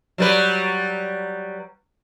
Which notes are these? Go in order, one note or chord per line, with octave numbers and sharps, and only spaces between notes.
F#3 G3 B4